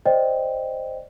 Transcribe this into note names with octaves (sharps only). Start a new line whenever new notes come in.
C5 D5 D#5 G5